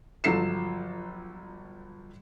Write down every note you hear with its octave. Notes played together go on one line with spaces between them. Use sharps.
G1 F3 F#3 A4 C7 E7